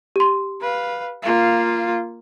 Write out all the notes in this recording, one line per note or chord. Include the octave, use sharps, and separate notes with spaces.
G4 C6
B4 F5
A#3 F4